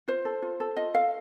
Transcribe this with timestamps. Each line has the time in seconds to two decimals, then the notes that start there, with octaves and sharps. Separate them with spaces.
0.08 F4 C5
0.25 A4
0.42 F4
0.60 A4
0.77 F4 D#5
0.94 A4 F5